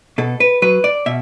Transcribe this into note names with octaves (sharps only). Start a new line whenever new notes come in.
B2 A4
B4
F#3 B4
D5
B2 E5